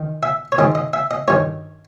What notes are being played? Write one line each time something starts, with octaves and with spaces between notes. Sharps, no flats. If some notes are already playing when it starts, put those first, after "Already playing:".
Already playing: D#3
E5
C#5
G#2 D#3 D#5
D#5
E5
D#5
G2 D#3 C#5